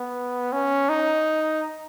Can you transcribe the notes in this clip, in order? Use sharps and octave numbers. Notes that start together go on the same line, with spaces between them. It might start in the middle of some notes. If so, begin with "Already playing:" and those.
Already playing: B3
C#4
D#4